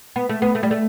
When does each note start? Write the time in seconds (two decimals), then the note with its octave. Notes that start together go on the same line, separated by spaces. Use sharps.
0.16 B3
0.29 A3
0.42 B3
0.55 A3
0.63 G3
0.71 A3